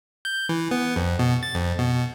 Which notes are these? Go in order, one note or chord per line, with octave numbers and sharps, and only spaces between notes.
G6
E3
B3
F2
B2
A6
F2
B2